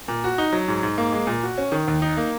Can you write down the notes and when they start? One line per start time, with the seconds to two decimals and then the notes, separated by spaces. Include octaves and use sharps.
0.08 A#2
0.24 F#4
0.38 D#4
0.53 F#3
0.68 G#2
0.83 G#2
0.98 A#3
1.12 G#3
1.27 A#2
1.43 F#4
1.58 C#4
1.72 D#3
1.88 D#2
2.02 D#4
2.17 A#3